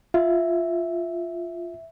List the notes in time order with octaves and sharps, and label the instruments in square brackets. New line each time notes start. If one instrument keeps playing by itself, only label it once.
[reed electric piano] F4 [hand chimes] E5